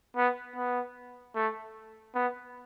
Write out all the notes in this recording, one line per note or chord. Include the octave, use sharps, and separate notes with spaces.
B3
B3
A3
B3